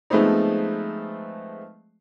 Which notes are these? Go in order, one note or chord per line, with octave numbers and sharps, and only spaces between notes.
F3 G#3 A3 B3 C4 D#4